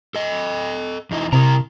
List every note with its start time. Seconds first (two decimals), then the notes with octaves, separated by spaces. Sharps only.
0.15 A4 D#5
1.11 E2 D#4 E4
1.33 C3 E4 A#4 A#5